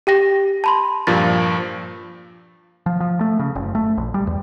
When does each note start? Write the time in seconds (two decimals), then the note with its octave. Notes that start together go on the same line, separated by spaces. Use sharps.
0.07 G4 G5 A#6
0.64 A5 B5 C6
1.07 G2 A#2 F3 A6
2.86 F3
3.00 F3
3.21 A3
3.39 C#3
3.55 F#1
3.75 A3
3.97 A#1
4.14 G3
4.27 E2